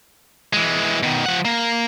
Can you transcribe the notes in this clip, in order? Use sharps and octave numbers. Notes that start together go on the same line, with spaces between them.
E3 G#3
B2 D#3
F3 F#5
A#3